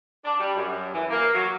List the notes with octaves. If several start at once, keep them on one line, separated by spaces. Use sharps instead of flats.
D4
G3
F#2
E3
A#3
F#3